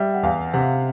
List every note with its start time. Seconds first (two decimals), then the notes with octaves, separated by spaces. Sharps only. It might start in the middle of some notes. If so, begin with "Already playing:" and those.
Already playing: G3 E5
0.14 F#5
0.23 E2 F5
0.54 C3 F#5